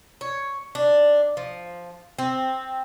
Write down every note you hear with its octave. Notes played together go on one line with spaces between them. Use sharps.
C#5
D4
F3
C4